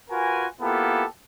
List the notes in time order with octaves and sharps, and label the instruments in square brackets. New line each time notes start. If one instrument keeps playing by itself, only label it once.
[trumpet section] F4 F#4 A#4 B4 G#5
A#3 B3 E4 F4 G4 A4